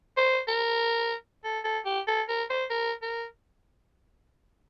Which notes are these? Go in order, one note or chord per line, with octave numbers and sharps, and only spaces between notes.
C5
A#4
A4
A4
G4
A4
A#4
C5
A#4
A#4